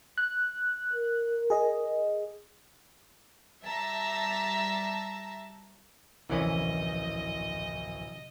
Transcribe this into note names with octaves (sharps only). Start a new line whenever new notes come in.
F#6
A#4
G#4 D#5
G3 E5 A5 A#5
D1 A#1 C3 E3 A#3 C#4 D#5